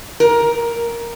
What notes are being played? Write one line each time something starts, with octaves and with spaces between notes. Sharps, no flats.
A#4